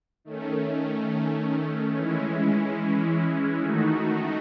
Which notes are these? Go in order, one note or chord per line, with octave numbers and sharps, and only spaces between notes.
D#3 A3 C#4
E3 G#3 C#4 E4
D#3 A3 D#4 F#4